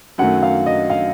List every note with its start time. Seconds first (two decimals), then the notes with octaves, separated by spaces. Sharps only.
0.18 F#2 D#3 F#3 A3 F#5
0.43 F5
0.66 D#5
0.90 F5